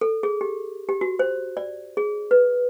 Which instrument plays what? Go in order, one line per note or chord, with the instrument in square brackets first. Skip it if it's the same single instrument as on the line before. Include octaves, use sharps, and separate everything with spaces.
[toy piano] A4
G#4
G4
G4
F#4
C5
D5
G#4
B4